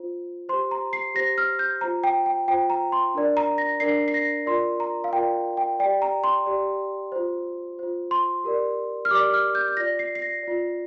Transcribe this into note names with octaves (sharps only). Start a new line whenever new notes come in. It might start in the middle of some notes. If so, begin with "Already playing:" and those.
Already playing: F4 C5
G4 C5 C6
A#5
C7
G4 C5 A#6
F6
G6
F4 C5 A#5
G5
G5
F4 C5 G5
A#5
C6
D4 A#4 D5
A#5
A#6
D4 A#4 D5 C7
C7
A#6
F4 A#4 D5 C6
A#5
F5
F4 A#4 D5 G5
G5
G4 D5 G5
A#5
C6
G4 D5
F4 C5
F4 C5
C6
G4 A#4 D5
F6
G4 A#4 D5 D6
F6
G6
G6
F4 D5 A#6
C7
C7
A#6
F4 D5